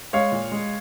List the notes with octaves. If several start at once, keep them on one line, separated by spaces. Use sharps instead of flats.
G#3 C#5 F5
A#2
G#3